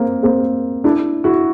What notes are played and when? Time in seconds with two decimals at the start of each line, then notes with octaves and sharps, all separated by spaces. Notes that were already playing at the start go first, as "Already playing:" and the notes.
Already playing: A#3 C4
0.23 A#3 C4
0.84 D4 E4
1.24 E4 F#4